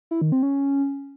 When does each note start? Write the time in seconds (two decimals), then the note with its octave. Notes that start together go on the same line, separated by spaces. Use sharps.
0.11 E4
0.22 D#3
0.32 C4
0.43 C#4